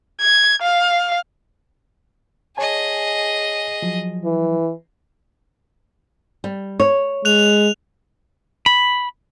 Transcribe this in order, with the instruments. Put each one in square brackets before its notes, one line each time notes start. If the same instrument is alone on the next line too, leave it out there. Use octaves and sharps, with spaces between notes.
[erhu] G#6
F5
[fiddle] G#4 D#5 [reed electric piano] C#5 G#5 A5
[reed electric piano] F3 F#3
[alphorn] E3
[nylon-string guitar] G3
C#5
[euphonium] G#3 [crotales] F#6 F7
[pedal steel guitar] B5